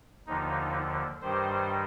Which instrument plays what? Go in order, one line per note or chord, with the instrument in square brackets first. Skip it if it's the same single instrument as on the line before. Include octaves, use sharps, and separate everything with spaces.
[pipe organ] D#2 D3 F3 D#4
G2 D#3 G3 C5